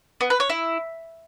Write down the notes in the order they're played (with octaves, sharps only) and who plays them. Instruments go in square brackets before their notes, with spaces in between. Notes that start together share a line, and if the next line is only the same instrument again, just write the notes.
[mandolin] B3
B4
C#5
E4